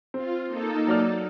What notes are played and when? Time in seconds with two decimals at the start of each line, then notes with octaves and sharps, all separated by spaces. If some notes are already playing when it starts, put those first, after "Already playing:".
0.14 C4 F4
0.46 A#3 D#4 A4
0.88 F#3 D5 F6